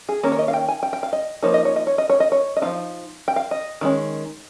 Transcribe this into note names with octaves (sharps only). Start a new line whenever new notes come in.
G#4
D#3 A#3 C#4 A#4
C#5
D#5
F5
G5
G#5
G5
G5
F5
D#5
F3 A#3 D#4 C#5
D#5
C#5
D#5
C#5
D#5
C#5
D#5
C#5
D#5
F3 C4 D#4 F5
G5
F5
D#5
D#3 G#3 C#4